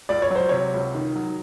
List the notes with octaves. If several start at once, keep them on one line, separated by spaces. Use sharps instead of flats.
C#2 D5
C#5
F#3
C5
C3 C#5
C#2
D#3
F#3